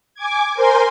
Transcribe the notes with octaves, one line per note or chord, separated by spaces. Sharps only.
G#5 D6 G#6
A#4 C5 G#5 C6